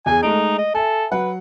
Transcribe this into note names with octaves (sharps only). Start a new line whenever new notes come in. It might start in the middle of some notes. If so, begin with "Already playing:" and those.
E2 G#4 G#5
G#3 A3 D#4 D7
D#5
A4 E5 G#5
F#3 B4 F#5